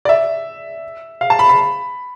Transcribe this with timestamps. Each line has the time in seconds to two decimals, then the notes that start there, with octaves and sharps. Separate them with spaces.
0.05 D5
0.09 E5
1.21 F5
1.30 A5
1.39 B5
1.49 B5